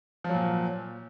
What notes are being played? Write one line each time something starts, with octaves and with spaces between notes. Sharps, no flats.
A#2 F3 F#3